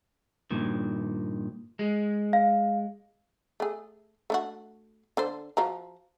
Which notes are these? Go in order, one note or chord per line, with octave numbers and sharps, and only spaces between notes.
G2 A#2 D#3
G#3
F5
A3 G#4
A3 D4 F#4
D3 A4 C5
F3 F#4 A#5